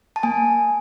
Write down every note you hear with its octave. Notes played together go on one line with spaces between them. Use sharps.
A5
A#3 G#5